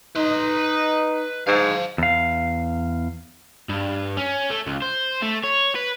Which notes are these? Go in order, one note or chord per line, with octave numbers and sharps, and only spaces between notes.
D#4 B4 C6
G#2 F5 A5
E2 F5
G2
C#4
A3
C#2
C5
A3
C#5
B4